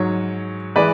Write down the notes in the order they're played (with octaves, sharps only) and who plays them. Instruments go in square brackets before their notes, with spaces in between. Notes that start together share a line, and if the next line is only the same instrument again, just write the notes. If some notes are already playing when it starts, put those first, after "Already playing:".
Already playing: [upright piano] G#2 F#3 C#5
E3 G#3 B4 D5